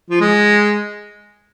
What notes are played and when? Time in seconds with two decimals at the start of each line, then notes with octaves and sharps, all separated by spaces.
0.10 F3
0.20 G#3